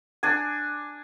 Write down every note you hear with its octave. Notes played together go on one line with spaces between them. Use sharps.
D4 G#5